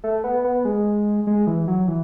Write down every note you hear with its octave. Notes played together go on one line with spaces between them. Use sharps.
A3
B3
B3
G#3
G#3
E3
F#3
E3